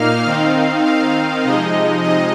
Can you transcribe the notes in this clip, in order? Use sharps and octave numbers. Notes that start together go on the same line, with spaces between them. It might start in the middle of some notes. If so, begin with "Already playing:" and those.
Already playing: A#2 A#3 D#4 F5 F6
D#3 C4 D#4 F5
F5
C3 F3 G#3 D#4 D#5
D#5